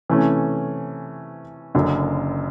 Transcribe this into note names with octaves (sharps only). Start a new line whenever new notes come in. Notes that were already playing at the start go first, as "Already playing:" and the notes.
C3 E3 A3 C#4
F#1 F#2 D3